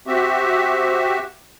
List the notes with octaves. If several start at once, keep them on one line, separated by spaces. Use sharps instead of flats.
C4 F#4 G4 E5